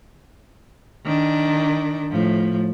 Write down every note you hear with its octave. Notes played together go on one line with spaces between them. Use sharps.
D#3 D4
A2 F3